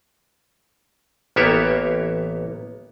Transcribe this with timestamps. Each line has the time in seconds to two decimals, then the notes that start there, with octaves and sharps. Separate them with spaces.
1.36 A1 A#3 B3 G4 C#5 E5